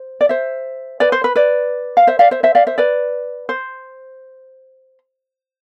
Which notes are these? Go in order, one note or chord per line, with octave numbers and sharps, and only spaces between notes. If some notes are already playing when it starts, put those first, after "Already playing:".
Already playing: C5
D5
C5 E5
B4 D5
C5
B4
B4 D5
F5
C5 E5
D5 F5
C5 E5
C5 E5
D5 F5
C5 E5
B4 D5
C5